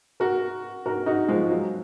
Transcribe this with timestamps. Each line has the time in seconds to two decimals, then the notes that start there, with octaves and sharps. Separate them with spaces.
0.20 F#4 A#4
0.86 F#4 A#4
1.06 D#4 F#4
1.28 F3 G#3
1.50 F#3